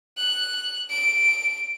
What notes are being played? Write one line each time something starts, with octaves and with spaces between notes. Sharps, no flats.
F#6
D7